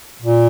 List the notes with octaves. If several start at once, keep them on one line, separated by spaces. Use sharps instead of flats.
A#2